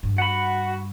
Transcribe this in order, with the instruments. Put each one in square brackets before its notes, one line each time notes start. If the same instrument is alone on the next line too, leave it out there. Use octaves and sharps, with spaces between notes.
[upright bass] G2
[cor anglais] F#4 [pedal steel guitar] F#5 B5